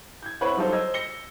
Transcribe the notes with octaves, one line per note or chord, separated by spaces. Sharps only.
G6 G#6
C4 E4 B4 C#5 F#5
F#3 G3 D#4 F4 A4 C5
C5 D#5 E6 G#6
A#6 C#7 G7